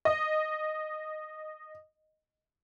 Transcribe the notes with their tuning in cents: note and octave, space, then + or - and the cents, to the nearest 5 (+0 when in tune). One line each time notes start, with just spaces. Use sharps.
D#5 -10